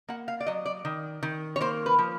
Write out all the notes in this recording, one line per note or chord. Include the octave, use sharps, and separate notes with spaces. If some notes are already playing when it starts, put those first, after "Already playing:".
A#3 F#5
F5
D5
F#3 D#5
D5
D#3
D#3
C#5
A#3 C5
B4
F3